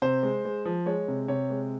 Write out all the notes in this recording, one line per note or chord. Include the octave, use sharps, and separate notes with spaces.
C3 C5
G#3
G#3
F3
G#3 C#5
C3
C3 C#5
G#3